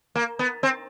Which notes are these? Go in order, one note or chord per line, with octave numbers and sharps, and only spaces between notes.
A#3
B3
C4